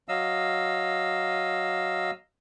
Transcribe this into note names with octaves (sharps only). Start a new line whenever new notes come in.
F#3 D#5 F5 E6